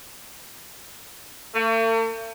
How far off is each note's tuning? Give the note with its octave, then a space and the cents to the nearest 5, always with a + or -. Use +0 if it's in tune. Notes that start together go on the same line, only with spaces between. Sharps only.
A3 +45